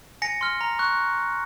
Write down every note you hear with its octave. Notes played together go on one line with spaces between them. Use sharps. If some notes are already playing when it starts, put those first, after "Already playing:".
G#5 A#6 C#7
C6 F6
A#5
C#6 F#6